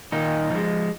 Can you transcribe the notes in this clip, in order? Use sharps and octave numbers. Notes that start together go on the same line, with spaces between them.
A#2 D#3 D#4
F3 G#3